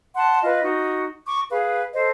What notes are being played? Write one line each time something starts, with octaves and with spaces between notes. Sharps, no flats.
F#5 A5 C6
F4 B4 D#5
D#4 F#4
C#6 D6
G#4 B4 F5
A4 C5 D#5